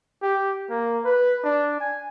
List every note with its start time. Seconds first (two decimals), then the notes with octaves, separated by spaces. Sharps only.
0.22 G4
0.70 A#3
1.05 B4
1.44 D4
1.80 G#5